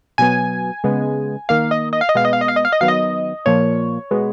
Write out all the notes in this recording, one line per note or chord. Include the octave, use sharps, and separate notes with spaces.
B2 F#3 B3 G#5
C#3 G#3 B3
D#3 A#3 F5
D#5
D#5
F5
D#5
B2 G#3 B3 F5
D#5
F5
D#5
F5
D#5
F5
D#5
D#3 F#3 B3 F5
D#5
A#2 F3 A#3 C#5
B2 G#3 B3